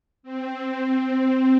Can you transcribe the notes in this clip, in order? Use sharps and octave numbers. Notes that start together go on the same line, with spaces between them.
C4